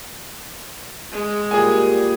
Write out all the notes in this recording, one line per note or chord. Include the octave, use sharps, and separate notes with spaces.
G#3
A#2 G3 G#4 G#5